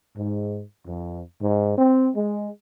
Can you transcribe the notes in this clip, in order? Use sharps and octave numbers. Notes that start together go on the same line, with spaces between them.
G#2
F2
G#2
C4
G#3